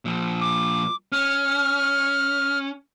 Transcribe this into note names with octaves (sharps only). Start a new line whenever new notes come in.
A#2 F3
D6
C#4 F6